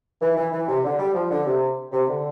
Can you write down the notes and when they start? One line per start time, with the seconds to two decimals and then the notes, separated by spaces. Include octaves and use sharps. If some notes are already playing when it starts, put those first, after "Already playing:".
0.21 E3
0.37 E3
0.52 E3
0.68 C3
0.84 D3
0.99 G3
1.14 F3
1.31 D3
1.46 C3
1.92 C3
2.08 D3